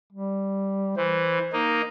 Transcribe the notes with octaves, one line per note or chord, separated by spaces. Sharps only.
G3
E3 C5
A#3 D#4